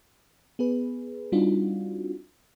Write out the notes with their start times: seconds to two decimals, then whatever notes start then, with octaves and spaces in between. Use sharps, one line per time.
0.59 B3 G#4 B4
1.32 G3 C4 D4 D#4 F4 F#4